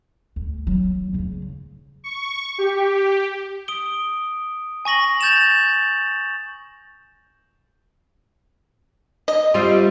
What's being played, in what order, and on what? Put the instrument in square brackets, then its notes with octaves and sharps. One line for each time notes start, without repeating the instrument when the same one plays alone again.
[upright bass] D2
F#3
C#3 D4
[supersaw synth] C#6
G4
[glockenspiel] D#6 D7 G7
G#5 C#6 A#6 F#7
G6 A6 A#6 E7 F7
[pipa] D#5
[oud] G3 C4 F4